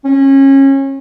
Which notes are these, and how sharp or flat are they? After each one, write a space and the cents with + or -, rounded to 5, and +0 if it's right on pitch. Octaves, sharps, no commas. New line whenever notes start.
C#4 -25